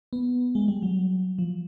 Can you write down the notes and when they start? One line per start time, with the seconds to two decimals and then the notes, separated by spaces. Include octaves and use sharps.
0.13 B3
0.55 G#3
0.68 G3
0.82 F#3
1.39 F3